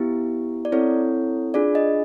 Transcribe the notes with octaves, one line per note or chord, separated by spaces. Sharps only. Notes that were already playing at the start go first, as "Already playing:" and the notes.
Already playing: B3 E4 G4
D5
C4 E4 A4 C#5
D4 F4 G#4 D5
D#5